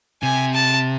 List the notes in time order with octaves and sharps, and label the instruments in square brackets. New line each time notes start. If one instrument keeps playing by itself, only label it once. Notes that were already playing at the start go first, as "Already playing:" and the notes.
[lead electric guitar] C3 [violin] G#5
[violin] A5